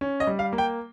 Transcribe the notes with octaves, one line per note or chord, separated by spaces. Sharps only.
C#4
D#5
G3
F5
A#3
G5